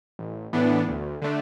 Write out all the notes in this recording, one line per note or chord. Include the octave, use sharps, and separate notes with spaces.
A1
A2 E3 B3 D4
D2
D3 A3 D4